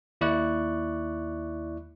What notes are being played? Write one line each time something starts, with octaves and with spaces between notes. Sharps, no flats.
D#2 E4 D5 C#6 F#6